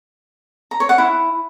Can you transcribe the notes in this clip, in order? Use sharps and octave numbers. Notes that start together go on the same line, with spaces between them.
A#5
C#5
F#5
E4